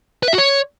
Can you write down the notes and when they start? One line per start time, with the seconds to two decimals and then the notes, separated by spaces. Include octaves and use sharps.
0.23 B4
0.28 E5
0.33 F#4
0.38 C#5